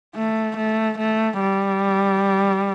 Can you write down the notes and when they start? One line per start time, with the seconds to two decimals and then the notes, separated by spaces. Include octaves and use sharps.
0.15 A3
0.57 A3
0.98 A3
1.40 G3